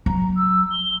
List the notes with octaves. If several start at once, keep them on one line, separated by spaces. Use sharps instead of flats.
F#3 A#5
E6
G7